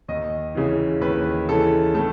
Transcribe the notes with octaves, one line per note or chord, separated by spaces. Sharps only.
D#2 D#5
C#3 E3
D#2 B4
C#3 E3 A4
A2 A4